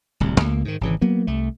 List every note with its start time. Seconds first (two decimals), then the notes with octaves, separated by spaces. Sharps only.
0.20 D1 C2
0.40 C#2 A#3
0.65 G#2 D#3
0.81 G#1 C#3 E3
1.01 F#3 A#3 B3
1.27 C2 A3